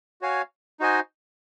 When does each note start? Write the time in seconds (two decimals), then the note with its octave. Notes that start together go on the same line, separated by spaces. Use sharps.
0.21 F#4 C#5 F5 G#5
0.80 D#4 F#4 C5 D#5 G#5